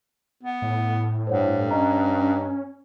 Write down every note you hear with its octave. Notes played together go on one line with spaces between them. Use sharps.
B3
A2
G2 C5 C#5 F#5
C#4 D#5 A#5